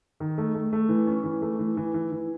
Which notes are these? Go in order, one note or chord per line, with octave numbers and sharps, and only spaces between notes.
D#3
A3
A3
A3
E3
C#4
E3
A3
E3
E3
E3
E3